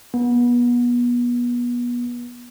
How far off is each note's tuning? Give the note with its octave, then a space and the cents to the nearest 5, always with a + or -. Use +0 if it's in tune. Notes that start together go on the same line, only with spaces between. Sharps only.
B3 -30